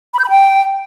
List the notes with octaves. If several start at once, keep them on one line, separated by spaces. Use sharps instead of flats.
B5
G6
B5
G5